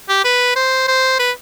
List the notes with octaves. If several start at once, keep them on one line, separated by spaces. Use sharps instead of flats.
G4
B4
C5
C5
B4